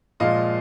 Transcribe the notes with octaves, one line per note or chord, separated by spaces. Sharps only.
A#2 F3 G#3 D#5 F5